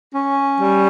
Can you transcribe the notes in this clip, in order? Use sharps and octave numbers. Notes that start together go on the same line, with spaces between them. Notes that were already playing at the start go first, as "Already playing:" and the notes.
C#4
G3